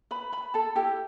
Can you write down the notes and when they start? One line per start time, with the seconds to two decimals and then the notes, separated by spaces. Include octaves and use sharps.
0.11 B4 B5
0.32 B4 B5
0.54 A4 A5
0.76 E4 G4 A4 G5